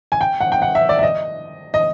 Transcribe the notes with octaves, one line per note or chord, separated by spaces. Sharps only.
G#5
G5
F#5
G5
F#5
E5
D5
E5
D#5
D#5